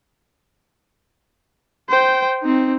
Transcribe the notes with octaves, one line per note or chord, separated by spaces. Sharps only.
C5 G5
C4 D#4